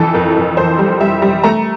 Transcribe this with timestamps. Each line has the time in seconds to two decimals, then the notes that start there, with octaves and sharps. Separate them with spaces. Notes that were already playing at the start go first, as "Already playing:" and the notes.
Already playing: F2 E3 A4
0.14 F2 A#4
0.36 F2
0.57 F2 C5
0.79 G3
1.00 G3 E5
1.22 G3
1.43 A3 A#5